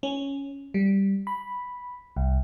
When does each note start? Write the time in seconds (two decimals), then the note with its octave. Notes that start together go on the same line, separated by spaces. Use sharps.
0.03 C#4
0.74 G3
1.27 B5
2.16 C2